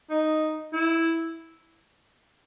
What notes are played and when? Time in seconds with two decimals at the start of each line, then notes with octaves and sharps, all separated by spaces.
0.10 D#4
0.73 E4